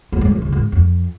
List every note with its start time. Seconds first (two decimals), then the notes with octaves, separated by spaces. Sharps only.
0.12 A#3
0.21 G#3
0.32 F3
0.42 C#3
0.52 G#2
0.72 F2